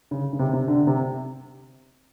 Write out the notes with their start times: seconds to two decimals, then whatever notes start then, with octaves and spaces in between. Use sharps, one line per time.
0.11 C#3
0.33 C#3
0.39 C3
0.53 C3
0.68 D3
0.87 C3